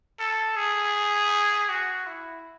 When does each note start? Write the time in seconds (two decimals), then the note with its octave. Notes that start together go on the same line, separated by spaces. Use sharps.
0.19 A4
0.56 G#4
1.69 F#4
2.06 E4